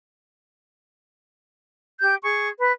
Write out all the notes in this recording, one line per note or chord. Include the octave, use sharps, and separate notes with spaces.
G4 G6
G#4 C#6
B4